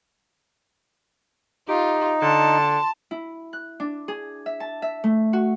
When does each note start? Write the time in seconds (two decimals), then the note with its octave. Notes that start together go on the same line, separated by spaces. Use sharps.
1.69 D#4 F4 G4
2.22 D3 A5 C6
3.11 E4
3.53 F#6
3.80 D4
4.08 G#4
4.46 E5
4.60 A5
4.82 E5
5.04 A3
5.33 F#4